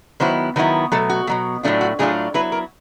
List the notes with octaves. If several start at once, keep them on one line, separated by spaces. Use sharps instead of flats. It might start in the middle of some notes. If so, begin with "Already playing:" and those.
D#3 F#3 B3 E4 C5
D#3 F#3 B3 E4 B4
B2 F#3 A3 A4
F#4
B2 F#3 A3
A2 F#3 A3 D4 F4
F#4
A2 F#3 A3 D4 F4 G#4
F#3 B3 E4 B4
A#4